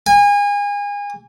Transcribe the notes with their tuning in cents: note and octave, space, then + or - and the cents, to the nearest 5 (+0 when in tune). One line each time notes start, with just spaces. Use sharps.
G#5 -30